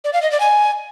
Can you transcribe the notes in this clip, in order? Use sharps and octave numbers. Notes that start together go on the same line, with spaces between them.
D5
F5
D#5
D5
G#5